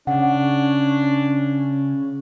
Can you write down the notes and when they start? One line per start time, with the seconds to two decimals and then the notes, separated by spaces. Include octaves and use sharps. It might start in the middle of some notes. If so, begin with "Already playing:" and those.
0.07 C#3 C#4 D4 F#5